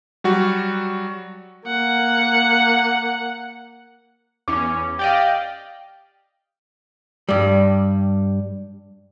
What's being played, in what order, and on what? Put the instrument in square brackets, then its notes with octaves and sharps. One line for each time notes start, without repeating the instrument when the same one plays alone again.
[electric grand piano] F#3 G3 F#4
[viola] A#3 F#5
[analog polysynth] E2 C#4 [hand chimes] D6
[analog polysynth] G4 D5 D#5 [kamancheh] F5 G5
[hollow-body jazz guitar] G2 G3